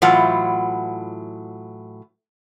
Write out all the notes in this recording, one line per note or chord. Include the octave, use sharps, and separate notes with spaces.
A2 E3 F#3 F4 F#5